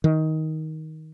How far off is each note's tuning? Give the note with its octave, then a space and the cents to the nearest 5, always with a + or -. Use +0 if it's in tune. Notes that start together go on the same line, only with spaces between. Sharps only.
D#3 +15